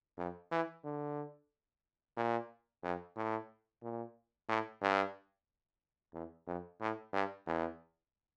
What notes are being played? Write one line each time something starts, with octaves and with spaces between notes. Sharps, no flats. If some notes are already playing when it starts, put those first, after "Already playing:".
F2
E3
D3
A#2
F2
A2
A#2
A2
G2
E2
F2
A2
G2
E2